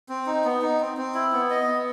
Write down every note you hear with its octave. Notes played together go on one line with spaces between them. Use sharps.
C4
D#4
B3
D#4
C4
C4
E4
B3
D#5
B3